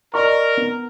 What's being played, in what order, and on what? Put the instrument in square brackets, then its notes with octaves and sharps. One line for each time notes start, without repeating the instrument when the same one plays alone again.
[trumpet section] A#4 [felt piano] D5 D#5 C#6
[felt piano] B3